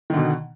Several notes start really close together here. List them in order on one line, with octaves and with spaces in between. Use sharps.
D#3 D3 B2